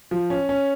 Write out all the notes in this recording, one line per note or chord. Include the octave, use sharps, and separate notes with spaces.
F3
C#4
C#4